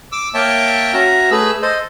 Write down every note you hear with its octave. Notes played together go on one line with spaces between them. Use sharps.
D6 E6
A#3 C#5 E5 G5 A5
C#4 F#4 E5 A#5
A3 G#4 B4 E6
A4 C5 D#5